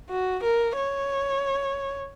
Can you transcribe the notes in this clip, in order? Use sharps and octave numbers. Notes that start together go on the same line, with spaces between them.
F#4
A#4
C#5